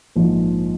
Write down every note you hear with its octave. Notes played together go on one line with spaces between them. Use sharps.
A#1 G#2 F3